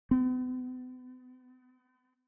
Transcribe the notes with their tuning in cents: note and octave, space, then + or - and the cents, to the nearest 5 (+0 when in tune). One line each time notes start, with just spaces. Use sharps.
B3 +45